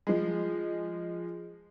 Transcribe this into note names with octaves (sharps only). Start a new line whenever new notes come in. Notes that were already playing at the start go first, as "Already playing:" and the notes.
F3 G#3